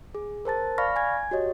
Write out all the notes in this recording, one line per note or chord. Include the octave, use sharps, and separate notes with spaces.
G#4
A#4 C5 A5 A6
D5 F5 B5 C#6 F6 A#6
G#5 G#6
F#4 G4 C#5 D#5